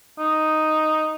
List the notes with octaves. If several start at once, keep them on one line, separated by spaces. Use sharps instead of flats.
D#4